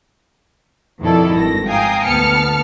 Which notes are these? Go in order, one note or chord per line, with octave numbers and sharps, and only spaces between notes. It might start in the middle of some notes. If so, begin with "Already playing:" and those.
F2 B2 D#3 E4 A4 D5
G#1 G2 A#6
F5 G5 G#5 A#5 D#6
D2 B3 A5 F6 C#7